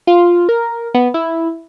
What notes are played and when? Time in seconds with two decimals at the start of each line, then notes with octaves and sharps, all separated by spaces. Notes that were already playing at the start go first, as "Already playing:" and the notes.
0.07 F4
0.49 A#4
0.94 B3
1.14 E4